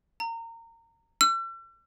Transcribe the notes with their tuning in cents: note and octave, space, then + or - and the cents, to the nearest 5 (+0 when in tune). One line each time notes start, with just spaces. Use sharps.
A#5 -25
E6 +40